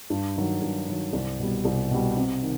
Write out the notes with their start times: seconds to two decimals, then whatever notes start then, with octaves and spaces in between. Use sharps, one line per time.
0.10 G2
0.36 D#3 F#3
0.62 G2
0.88 D#3 F#3
1.13 C2
1.39 B2 G3
1.65 C2
1.91 B2 G3
2.16 C3
2.42 D#3